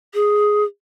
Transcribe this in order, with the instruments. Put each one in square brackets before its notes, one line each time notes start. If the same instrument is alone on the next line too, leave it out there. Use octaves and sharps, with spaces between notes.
[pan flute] G#4